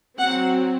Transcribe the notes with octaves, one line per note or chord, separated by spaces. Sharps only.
F#3 C4 F#5